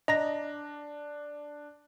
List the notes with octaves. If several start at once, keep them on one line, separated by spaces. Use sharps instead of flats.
D4 D#5 A#5 A#6